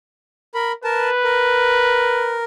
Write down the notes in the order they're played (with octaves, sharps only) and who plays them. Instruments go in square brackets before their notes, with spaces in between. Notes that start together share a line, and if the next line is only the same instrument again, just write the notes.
[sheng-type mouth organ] A#4 B5
[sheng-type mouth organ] A#4 A5 [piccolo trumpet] B4
[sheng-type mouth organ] A#4